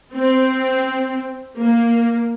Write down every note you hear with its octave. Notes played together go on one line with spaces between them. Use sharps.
C4
A#3